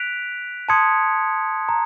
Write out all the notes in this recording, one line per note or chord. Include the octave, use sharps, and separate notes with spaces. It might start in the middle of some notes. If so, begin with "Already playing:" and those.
Already playing: F#6 B6 D7 F7
A5 C6 D#6 G#6 C#7
A#5